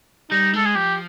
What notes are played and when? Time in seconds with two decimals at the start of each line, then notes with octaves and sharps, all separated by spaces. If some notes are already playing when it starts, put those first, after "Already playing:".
0.31 G3 D#4
0.54 G#3 A4
0.66 G#4
0.75 F3 G4